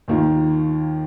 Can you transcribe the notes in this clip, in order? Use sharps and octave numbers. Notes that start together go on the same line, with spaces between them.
D#2 D#3 A#3 F4